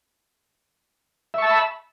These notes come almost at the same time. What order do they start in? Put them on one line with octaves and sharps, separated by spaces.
E5 C#6 A5 E6 B5